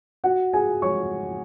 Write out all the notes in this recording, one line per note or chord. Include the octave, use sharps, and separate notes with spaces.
F#4 F#5
G#4 G#5
C#5 C#6